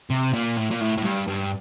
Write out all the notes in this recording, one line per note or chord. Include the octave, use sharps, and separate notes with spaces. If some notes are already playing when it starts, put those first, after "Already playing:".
C3
A#2
A2
A#2
A2
A2
G2
G2